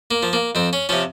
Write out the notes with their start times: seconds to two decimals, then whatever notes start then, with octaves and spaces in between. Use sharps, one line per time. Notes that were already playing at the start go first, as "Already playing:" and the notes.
0.11 A#3
0.23 F3
0.33 A#3
0.55 F2 C4
0.73 C#4
0.89 C3 F3 C#4